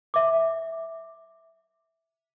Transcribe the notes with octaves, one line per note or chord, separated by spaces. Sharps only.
E5 D6